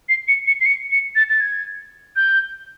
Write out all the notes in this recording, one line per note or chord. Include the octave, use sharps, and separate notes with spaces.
C7
C#7
C#7
C7
C#7
C#7
A6
A6
G#6
G6